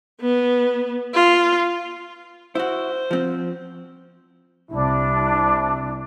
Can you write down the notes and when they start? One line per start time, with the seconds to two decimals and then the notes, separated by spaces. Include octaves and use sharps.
0.20 B3
1.14 F4
2.55 E4 F#4 C5
3.11 F3 C4
4.71 C2 C3 D4 E4